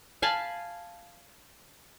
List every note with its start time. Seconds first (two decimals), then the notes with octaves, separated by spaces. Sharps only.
0.22 F5 G#5 A5 B5